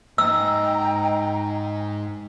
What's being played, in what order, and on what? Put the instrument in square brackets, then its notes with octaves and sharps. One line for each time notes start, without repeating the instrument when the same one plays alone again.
[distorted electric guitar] G#2 [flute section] D#5 G5 A#5 [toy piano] E6